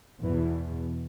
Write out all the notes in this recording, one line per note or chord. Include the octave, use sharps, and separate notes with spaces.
E2 B2 E3